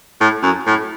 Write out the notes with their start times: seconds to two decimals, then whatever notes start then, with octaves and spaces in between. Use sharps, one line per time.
0.21 A2
0.43 F#2
0.67 A2